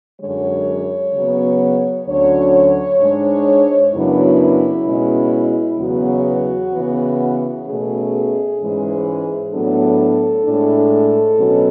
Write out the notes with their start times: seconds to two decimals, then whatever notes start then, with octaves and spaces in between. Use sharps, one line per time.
0.20 F#2 D3 G#3 C#5
1.14 C#3 F#3 B3
2.06 D2 D3 F#3 C#4 C#5
3.00 G#2 G#3 D4
3.93 F#2 C#3 F#3 B3 D4 E4
4.87 B2 G#3 C#4
5.79 E2 C#3 F#3 B3 F#4
6.72 C#3 E3 B3
7.66 B2 A3 C#4 G#4
8.59 G#2 E3 G#3 C#4
9.52 A2 F#3 B3 D4 A4
10.45 A2 G#3 D4
11.39 B2 F#3 C#4